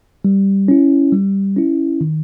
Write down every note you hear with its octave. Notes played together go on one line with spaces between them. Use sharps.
G3
C#4 E4
G3
C#4 E4
D#3